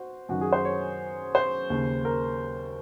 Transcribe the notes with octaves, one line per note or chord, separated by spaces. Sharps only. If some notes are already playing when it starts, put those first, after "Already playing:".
Already playing: F#4 C5
F#2 D#3 F#4
G#4
C5
C#5
C5
D#2 C#3
A#4